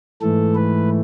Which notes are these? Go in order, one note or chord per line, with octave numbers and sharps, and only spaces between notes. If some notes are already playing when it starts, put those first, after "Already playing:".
G#2 E3 A3 A4
B4